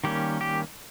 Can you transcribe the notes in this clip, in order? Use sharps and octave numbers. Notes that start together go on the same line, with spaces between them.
D#3 G3 A#3 C#4 G4
G4